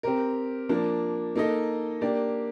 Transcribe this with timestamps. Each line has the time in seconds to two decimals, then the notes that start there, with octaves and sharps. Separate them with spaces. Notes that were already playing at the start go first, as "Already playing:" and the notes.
0.03 C4 G4 A#4
0.69 F3 A#3 D4
1.36 A#3 D#4 A4 D#5
2.01 A#3 D4 G4 D5